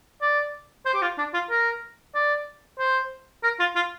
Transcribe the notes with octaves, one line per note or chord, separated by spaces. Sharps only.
D5
C5
G4
F4
D4
F4
A#4
D5
C5
A#4
F4
F4